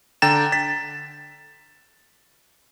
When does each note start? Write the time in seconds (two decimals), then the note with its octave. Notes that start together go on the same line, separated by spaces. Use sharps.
0.22 D3 G5 A#5 A6 E7
0.52 A6 B6